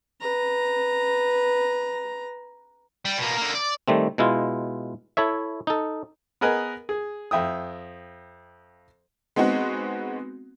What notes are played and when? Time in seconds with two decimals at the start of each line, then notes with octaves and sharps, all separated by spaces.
0.21 B4 A#5
3.05 G3
3.18 B2 A#3
3.38 D3 A#3
3.55 D5
3.88 D#3 G3 A3 C4
4.18 B2 G#3 E4 F4
5.17 E4 A4 C#5 E5
5.67 D#4 A4
6.41 B3 G#4 A#4 B4 D#5 G#5
6.89 G#4
7.31 F2 E5 G5 D#6
9.36 G#3 B3 C4 D#4 F#4